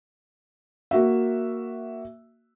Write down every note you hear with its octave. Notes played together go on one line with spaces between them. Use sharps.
A#3 F#4 E5